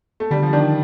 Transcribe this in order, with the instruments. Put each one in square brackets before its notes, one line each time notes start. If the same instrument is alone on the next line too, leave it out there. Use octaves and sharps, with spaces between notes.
[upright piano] A3
[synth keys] D3 [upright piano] G3
[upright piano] F3
[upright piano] D#3 [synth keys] D4